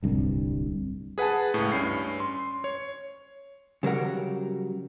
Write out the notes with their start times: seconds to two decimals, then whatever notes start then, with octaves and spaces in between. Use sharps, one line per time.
0.03 D1 C2 G2
1.18 G#4 B4 F#5 G#5 A5
1.54 C#2 A2
1.72 G2 C#4 C7
2.20 C6
2.64 C#5
3.83 C#3 F#3 G3 A#4 F#5